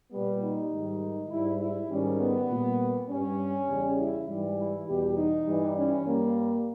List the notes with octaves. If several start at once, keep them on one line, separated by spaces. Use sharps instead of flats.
A#2 G3 B3
D#4
G#2 D#3 G3
G#2 G3 E4
E4
G#2 D#3 G3 C#4
B3
A#2 G3
G2 G3 C#4
E2 C#3 G3
E4
G#2 E3 G3
E4
E2 B2 G3 G4
D#4
G2 E3 G3
C#4
G2 G3 A#3